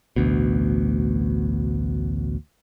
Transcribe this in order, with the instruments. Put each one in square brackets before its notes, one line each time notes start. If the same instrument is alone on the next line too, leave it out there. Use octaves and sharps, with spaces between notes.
[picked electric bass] A1 D2 B2